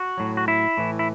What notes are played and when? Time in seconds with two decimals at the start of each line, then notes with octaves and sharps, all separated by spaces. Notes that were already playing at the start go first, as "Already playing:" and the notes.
Already playing: F#4
0.18 A2 F#3
0.37 F#4
0.48 E4
0.77 A2 E3
0.99 E4